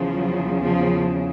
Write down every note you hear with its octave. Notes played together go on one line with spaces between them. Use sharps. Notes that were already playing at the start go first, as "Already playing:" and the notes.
Already playing: E2 C#3 F3
F#3
F3